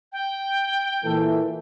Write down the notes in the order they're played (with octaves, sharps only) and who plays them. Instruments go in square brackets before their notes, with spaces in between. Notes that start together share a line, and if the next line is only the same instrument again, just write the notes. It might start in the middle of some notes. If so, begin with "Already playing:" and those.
[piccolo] G5
[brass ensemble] A#2 E3 [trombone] A4